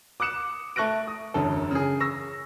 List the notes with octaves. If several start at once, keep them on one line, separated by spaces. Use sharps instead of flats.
D6 D#6 F#6 C#7 E7
A3 C#6 F#6 A#6 D7
D#6
E1 F#2 D3 A4
C#3 G#4
C#6 E6 A#6